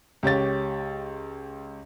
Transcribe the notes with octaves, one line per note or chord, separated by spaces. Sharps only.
C#2 G4 C#5 A6